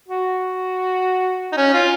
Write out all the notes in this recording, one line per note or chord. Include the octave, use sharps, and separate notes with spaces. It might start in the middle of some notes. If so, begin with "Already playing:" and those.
F#4
D#4
C#4
F4